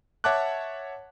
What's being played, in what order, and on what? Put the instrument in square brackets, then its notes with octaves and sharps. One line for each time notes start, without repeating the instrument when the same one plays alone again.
[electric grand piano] C#5 E5 F#5 A5 D6 F#6